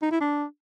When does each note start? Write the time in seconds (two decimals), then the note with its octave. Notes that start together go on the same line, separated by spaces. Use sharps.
0.02 D#4
0.11 E4
0.21 D4